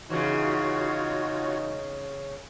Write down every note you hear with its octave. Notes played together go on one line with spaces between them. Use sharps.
C#3 E3 D#4 F4 F#4 C#5